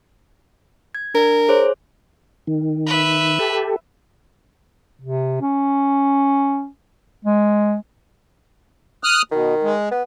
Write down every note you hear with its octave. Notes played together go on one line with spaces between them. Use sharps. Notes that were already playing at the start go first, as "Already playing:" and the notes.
G#6
D4 A#4
G#4 C5 C#5
D#3
B4 E5
G4 A4
C3
C#4
G#3
D#6 F6 F#6
B2 D#3
G#3
B3